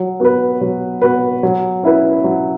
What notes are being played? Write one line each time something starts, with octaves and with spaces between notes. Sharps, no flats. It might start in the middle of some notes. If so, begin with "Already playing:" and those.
Already playing: F#3
B3 F#4 B4
F#3
B3 F#4 B4
F#3
C#4 E4 B4
F#3